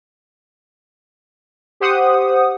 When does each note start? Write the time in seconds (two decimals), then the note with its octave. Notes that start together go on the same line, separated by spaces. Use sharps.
1.80 G4 C5 F#5 D#6